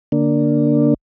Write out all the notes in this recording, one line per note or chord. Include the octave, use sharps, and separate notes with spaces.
D3 A#3 D4